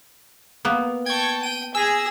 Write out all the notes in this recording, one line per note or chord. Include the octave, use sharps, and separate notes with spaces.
A#3 B3
G5 A5 C#6 G#6
G5 D#7
G#4 G#5 E6 A#6